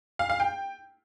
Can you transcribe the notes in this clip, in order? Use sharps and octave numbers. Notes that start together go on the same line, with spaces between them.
F5
F5
G5